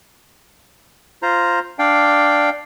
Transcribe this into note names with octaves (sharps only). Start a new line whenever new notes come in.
F4 C5 A#5
D4 D5 F5 G5